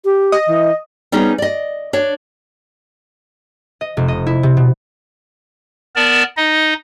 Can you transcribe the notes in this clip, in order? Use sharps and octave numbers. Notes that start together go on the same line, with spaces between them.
G4
D#5
E3
G3 B3 C#4 D#4 G#4
D5 D#5
D4 C#5
D#5
F1
D#5
E4
C3
B2
B3 A#4 D5 A5
D#4 D#5